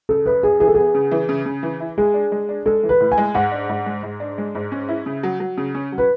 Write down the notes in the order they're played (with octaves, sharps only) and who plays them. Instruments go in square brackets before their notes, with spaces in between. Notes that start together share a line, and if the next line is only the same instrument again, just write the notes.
[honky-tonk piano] C#3 [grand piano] A4
[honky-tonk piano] F#2 [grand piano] B4
[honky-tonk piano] F#2 [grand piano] G#4
[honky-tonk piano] E3 [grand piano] G#4
[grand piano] A4
[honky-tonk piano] B3 [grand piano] G#4
[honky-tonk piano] C#3
E3
C#3
C#3
E3
E4
[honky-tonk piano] G#3 [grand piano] G#4
[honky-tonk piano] D4
G#3
D4
[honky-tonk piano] G#3 [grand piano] A4
[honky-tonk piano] E3
[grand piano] B4
[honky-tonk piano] A2
[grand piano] G#5
[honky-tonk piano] G#3
[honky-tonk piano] G#2 [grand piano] F#5
[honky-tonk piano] D4
G#2
G#3
G#2
D4
G#3
G#2
C#4
E4
C#3
F#3
F#3
C#3
C#4
F#3
[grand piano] B4